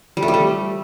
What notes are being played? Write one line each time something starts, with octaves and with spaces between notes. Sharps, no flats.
G3
A3
G3
A3